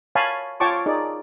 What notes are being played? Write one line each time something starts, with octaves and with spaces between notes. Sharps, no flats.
C#5 F5 G#5 A5 B5
F4 C#5 G5 A5 C#6 D6
D#4 G#4 D5